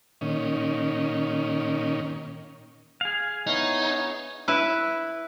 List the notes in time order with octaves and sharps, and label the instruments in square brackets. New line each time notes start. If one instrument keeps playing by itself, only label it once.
[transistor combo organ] A#2 D#3 C#4
[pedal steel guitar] G#4 F5
[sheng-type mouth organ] B3 E4 C#5 [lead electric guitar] D#4
[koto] E4 B4